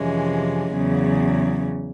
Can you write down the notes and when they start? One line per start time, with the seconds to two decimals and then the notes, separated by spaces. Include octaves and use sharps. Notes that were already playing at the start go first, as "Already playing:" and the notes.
Already playing: F2 C3 E3 G#3 C#4
0.73 E2 C#3 F#3